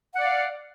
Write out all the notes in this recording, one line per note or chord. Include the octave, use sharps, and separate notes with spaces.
D5 F5 F#5